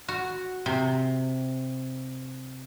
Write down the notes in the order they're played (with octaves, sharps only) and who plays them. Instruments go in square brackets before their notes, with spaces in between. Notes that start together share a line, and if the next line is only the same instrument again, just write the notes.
[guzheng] F#4
C3